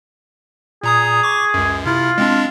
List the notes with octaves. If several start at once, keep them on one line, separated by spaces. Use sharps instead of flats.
A#2 G#4 A#5 D#6
C#6 D6
C#2 F#2
C3 E4 F4
G#3 C4 D4